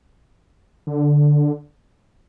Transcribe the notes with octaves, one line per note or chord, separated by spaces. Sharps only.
D3